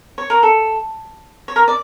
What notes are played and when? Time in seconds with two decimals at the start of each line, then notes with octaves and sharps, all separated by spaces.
0.18 C#5
0.30 A#4
0.43 A4
1.48 C#5
1.56 A#4
1.68 D5